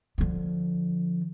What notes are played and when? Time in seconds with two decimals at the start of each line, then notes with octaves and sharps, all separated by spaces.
0.18 D3 F3